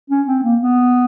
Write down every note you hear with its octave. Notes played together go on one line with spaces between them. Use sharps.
C#4
C4
A#3
B3